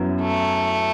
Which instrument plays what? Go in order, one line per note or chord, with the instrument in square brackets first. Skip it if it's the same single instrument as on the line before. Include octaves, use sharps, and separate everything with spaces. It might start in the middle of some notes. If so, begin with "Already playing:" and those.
Already playing: [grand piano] F#2 F#3 B3 E4
[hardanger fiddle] A3